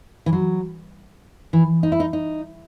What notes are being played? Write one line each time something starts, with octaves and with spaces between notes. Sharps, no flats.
E3
F#3
E3
D#4
E4
D#4
D#4